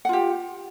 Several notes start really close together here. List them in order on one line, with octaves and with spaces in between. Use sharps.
F#5 F4 G4